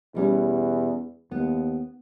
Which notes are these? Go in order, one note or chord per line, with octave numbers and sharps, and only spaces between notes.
E2 B2 G3 C#4
D#2 B3